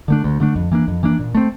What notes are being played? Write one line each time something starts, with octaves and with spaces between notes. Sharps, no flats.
D3 A3 D4
D2
D3 A3 D4
F2
E3 A#3 D4
F2
E3 A#3 D4
A#2
A3 C4